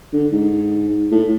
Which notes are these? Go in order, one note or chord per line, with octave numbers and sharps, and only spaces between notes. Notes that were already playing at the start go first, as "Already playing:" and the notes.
D3
G#2
A2